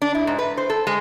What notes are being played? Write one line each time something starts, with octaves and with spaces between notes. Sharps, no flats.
D4
E4
G#2
B4
C5
A4
G#3